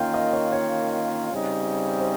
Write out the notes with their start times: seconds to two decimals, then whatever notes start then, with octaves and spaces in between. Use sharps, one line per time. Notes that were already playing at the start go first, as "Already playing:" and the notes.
Already playing: D#3 A#3 C#4 F4 F5 G5
0.14 D#5
0.33 C#5
0.52 C#5
1.32 C#3 G3 C4 D#4
2.00 C5